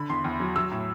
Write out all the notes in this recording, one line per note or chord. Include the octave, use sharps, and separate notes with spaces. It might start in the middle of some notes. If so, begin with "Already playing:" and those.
Already playing: D3 B5
E2 C6
E2
F#3
F#3 E6
A2